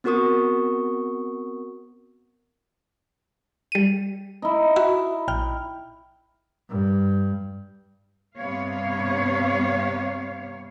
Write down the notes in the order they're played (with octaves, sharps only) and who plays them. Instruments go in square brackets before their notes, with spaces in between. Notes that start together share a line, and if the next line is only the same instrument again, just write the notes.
[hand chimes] B3 C4 F#4 A#4 C#6 D#6
[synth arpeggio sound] G3 D#7
[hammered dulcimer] D#4 E4
[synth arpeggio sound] F#4 E5
A#1 G5 F6
[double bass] G2
[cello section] G2 C3 B3 C#5 F5